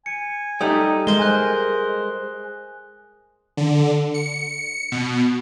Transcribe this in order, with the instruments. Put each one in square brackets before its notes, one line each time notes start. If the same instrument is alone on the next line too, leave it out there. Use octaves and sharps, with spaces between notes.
[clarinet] G#5 [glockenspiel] C#7
[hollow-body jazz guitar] G3 A3 D#4 [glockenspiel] D#6
[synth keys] G#3 C5 [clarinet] A#4 [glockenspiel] G7
[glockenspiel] G#5 F#6
[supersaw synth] D3
C#7
B2